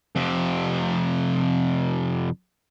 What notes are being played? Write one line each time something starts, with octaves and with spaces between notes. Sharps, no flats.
F2 C3